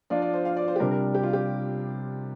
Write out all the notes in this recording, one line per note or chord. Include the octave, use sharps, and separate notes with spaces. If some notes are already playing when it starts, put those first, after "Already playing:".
F3 D4 F4 D5
D5
C5
F5
D5
C5
G4
C3 G3 D4 A#4
A#4
G4
F4
G4